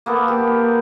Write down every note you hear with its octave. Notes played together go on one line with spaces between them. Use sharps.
A#3 B3 A4
G4